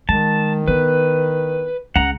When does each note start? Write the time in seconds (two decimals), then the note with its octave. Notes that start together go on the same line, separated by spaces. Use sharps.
0.09 D#3 G#3 A5
0.68 B3 E4 B4
1.96 C#2 F#5 A#5